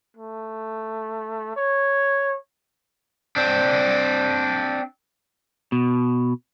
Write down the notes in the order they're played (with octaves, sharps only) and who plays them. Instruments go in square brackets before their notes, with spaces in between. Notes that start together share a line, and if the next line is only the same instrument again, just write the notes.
[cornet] A3
C#5
[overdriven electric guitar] C4 D4
[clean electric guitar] B2